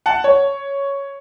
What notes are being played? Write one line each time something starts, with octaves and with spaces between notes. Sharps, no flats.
F#5 A5
C#5